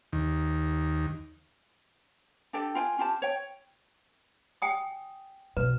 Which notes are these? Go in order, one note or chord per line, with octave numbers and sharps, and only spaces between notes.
D#2
D4 G4 A4 G5
F4 G5 G#5
C#4 F4 G4 A5
C#5 G5
G5 G#5 D#6
B2 B4